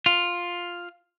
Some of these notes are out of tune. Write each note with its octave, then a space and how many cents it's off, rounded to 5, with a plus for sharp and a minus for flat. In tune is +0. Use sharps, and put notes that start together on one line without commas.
F4 +5